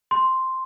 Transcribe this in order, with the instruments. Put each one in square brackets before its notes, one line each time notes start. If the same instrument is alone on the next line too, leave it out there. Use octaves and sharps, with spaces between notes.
[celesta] C6